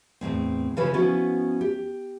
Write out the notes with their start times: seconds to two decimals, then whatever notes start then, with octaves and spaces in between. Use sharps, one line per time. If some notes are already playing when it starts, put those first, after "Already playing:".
0.21 E2 A2 C#3 C4
0.77 C#3 E3 F3 C#4 G#4 B4
0.94 F3 B3 C#4 E4 F#4 B4
1.61 G4